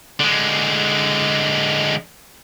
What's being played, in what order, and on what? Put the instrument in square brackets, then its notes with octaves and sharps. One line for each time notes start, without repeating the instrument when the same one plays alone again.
[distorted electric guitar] D3 G#3